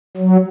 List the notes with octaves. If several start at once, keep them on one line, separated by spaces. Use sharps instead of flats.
F#3